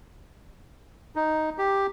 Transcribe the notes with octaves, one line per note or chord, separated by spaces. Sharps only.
D#4
G4